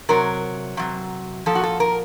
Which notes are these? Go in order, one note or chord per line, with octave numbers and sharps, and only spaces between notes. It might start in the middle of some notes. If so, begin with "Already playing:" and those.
C3 F#3 A#4
C3 F#3
A#2 F3 A4
F#4
A4
A#4